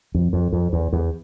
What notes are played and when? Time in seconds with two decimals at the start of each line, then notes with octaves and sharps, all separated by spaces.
0.14 F2
0.33 F2
0.53 F2
0.73 E2
0.93 E2